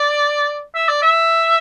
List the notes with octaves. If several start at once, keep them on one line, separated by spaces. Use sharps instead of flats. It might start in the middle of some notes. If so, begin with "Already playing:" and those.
Already playing: D5
E5
D5
E5